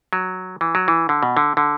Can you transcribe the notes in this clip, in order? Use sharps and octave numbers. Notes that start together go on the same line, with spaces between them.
F#3
E3
F#3
E3
D3
B2
D3
D3